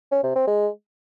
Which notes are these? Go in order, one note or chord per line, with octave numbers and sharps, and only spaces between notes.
C#4
C3
C4
G#3